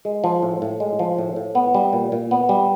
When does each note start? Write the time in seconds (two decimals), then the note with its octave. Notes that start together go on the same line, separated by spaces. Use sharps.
0.05 G#3
0.24 F3
0.42 A2
0.62 A2
0.80 G#3
0.99 F3
1.18 A2
1.36 A2
1.55 B3
1.74 G3
1.93 A#2
2.12 A#2
2.31 B3
2.49 G3